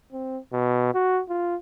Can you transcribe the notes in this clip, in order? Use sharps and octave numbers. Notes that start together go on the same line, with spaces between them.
C4
B2
F#4
F4